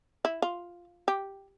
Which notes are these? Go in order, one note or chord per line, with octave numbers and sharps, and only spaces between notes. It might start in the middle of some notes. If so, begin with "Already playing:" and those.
E4
F4
G4